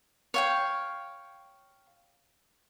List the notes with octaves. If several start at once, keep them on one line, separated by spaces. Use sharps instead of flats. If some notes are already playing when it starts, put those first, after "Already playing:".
C#5 F5 G5